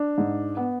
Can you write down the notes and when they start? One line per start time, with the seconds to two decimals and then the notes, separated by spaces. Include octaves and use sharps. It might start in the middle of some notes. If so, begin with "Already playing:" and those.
Already playing: D4
0.18 G#2
0.57 B3